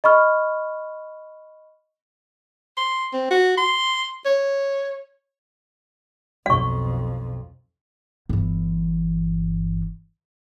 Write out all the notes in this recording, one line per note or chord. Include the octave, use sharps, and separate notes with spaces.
D#5 B5 C#6 F6
C6
C4
F#4
C6
C#5
B1 F2 F#5 C#6
G1 E3